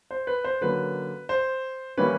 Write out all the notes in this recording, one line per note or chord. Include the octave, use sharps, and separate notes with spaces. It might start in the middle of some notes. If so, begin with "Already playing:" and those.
C5
B4
C5
D3 F#3 A#3 C#4 B4
C5
E3 G3 A#3 C#4 B4